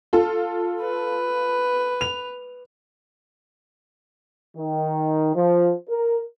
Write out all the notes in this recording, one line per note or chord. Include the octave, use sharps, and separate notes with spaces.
F4 A4
B4
F7
D#3
F3
A#4